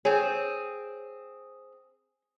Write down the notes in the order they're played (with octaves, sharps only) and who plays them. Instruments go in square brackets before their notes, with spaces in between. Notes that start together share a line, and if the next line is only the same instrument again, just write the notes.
[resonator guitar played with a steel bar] C4 G#4 [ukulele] C#5